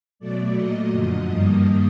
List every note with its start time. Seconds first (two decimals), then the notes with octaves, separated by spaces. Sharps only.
0.19 B2 F#3 A3 D5
0.55 A#2 F#3 A3 D#5
0.91 F#2 D3 F3 D#5
1.27 G2 D#3 G3 A#3 D#5